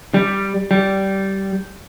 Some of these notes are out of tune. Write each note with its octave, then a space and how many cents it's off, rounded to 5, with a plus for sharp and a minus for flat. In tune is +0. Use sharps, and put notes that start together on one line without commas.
G3 +0
G3 -15